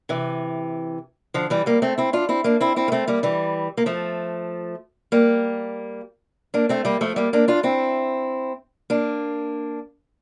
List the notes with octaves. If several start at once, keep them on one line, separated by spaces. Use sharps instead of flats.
C3 E3
D3 F3
E3 G3
G3 A#3
A3 C4
C4 E4
D4 F4
C4 E4
A#3 D4
C4 E4
C4 E4
A#3
A3 C4
G3 A#3
E3 G3
A#3
F3 A3
G3 A#3
A#3 D4
A3 C4
G3 A#3
F3 A3
G3 A#3
A#3 D4
D4 F4
C4 E4
A#3 D4